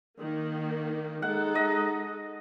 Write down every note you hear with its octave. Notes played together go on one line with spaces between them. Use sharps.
D#3 A#3
G#3 D#4 A4 F#5
D#5